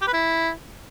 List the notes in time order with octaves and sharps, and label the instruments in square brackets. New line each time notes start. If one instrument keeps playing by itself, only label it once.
[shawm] G4
B4
E4